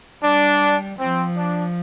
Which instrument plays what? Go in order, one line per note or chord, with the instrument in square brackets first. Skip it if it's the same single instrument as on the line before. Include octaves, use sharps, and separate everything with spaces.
[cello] G3 [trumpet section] D4
[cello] F3 [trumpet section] C4
[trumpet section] D4